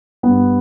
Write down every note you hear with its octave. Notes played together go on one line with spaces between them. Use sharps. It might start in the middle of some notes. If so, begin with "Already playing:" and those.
G2 G3 B3